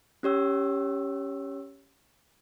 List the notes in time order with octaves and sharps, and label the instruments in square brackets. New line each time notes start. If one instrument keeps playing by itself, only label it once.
[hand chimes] C#4 G4 C#5 E6